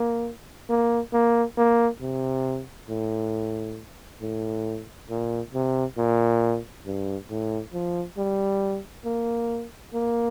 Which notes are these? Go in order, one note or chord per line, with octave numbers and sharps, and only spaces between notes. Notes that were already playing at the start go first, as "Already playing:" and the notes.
Already playing: A#3
A#3
A#3
A#3
C3
A2
A2
A#2
C3
A#2
G2
A2
F3
G3
A#3
A#3